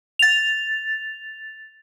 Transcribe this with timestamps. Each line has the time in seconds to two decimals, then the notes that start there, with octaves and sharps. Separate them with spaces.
0.19 A6 F7